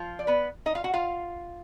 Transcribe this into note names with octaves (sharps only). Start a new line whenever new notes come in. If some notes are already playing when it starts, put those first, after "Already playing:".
Already playing: F3 F4
D5
B3 B4
D#4 D#5
F4 F5
F#4 F#5
F4 F5